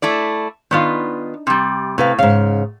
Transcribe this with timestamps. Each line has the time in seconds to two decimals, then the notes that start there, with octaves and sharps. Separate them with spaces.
0.02 A3 E4 D5
0.71 D#3 B3 D4 D#4 F4
1.47 C3 G3
1.98 A2 C3 B4 F5
2.19 G#2 C#3 F5